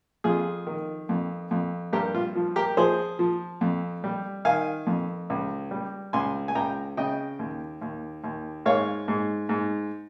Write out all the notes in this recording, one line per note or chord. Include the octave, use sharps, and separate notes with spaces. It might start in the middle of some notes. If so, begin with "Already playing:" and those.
F2 F4 G#4
D#3
F2
F2
G2 G4 A#4
F4
F3
G4 A#4
F3 G#4 C5
F3
F2
G3
D#3 F5 G#5
F2
C#2
G3
C#2 G#5 C6
G#5
C#2 G5 A#5
C#3 D#5 G5
D#2
D#2
D#2
G#2 C#5 F5
G#2
G#2